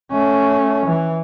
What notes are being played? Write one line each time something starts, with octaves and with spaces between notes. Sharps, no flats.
A3 C#4
E3